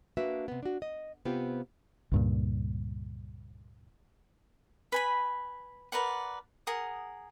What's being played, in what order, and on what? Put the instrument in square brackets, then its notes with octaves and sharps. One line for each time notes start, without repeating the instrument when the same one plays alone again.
[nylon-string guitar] A#3 D4 F#4 B4 E5
C3 B3
D4 F#4
D#5
C3 B3 C4 F4 G4
[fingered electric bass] C#2 G2 A#2
[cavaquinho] B4 G#5 B5
A#4 B4 D5 F#5
G#4 A#4 F#5 D#6